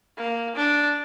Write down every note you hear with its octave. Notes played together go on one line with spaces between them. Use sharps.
A#3
D4